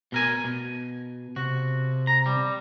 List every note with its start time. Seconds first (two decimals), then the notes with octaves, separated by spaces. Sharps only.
0.12 B2 A#4 G#5
0.44 B2
1.36 C3 F#4
2.07 A#5
2.26 G3